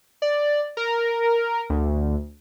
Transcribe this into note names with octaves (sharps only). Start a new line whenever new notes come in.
D5
A#4
D2